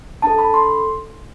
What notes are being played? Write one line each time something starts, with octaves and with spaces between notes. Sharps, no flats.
D4 A4 A5
B5
C6